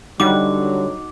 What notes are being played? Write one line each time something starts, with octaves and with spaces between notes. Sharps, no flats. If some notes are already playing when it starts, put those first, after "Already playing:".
D3 F#3 G3 D#4 F#4 F#5 D6